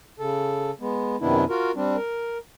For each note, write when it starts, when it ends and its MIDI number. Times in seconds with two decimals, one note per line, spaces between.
0.19 0.71 49
0.19 0.71 69
0.80 1.16 56
0.80 1.16 59
1.21 1.44 42
1.21 1.44 48
1.21 1.44 51
1.21 1.44 59
1.21 1.44 62
1.21 1.44 64
1.50 1.71 65
1.50 1.71 66
1.50 1.71 70
1.75 1.96 55
1.75 1.96 60
1.75 1.96 62
1.97 2.38 70